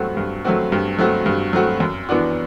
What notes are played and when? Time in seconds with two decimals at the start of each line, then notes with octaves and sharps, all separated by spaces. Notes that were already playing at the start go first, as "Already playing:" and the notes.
Already playing: G2 F#3 A3 C4 F#4
0.17 G2
0.45 F#3 A3 C4 F#4
0.72 G2
0.99 F#3 A3 C4 F#4
1.26 G2
1.53 F#3 A3 C4 F#4
1.80 F#2
2.09 E3 B3 D4 F#4